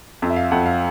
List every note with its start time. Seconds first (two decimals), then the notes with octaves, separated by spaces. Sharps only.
0.22 F2
0.30 E5
0.36 F5
0.51 F2 F#5
0.66 F5